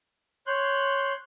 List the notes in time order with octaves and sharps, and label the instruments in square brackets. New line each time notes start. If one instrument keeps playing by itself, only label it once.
[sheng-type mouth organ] C#5 C6 F#6 G6